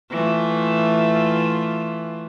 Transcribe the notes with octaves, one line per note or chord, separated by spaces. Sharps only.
E3 A3 F4